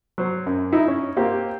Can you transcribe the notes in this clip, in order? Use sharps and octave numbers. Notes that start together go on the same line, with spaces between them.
F#3 C5
F#2
D#4 E4
C#4
A#3 C4 G4